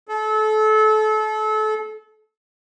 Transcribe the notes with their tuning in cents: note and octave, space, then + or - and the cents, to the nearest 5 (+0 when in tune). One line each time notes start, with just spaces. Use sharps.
A4 -30